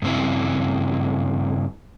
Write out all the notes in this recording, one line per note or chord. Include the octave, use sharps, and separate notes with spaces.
G2 C#3 C4 E4